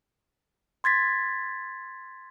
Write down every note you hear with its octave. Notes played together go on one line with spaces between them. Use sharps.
C6 G#6 A6 B6